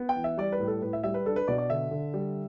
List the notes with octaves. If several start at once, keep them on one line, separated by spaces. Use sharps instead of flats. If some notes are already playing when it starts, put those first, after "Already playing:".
Already playing: B3
G5
E3
E5
G3 D5
B4
A2
A4
A2 B4
E5
G3 E5
B4
D4 A4
B4
B2 D5
D5
D3 E5
D3
G3